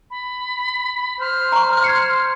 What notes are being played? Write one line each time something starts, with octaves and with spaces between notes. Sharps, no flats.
B5
C5 F6
A#5 C#6
G#6 C7 C#7